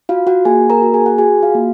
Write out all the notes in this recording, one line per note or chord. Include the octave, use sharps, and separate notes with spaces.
F4 F#4 F5
F#4 F#5
A#3 G#4 G#5
A#4 A#5
F#4
G#4 G#5
F#5
F#4 G#4 G#5
F4 F5
A#3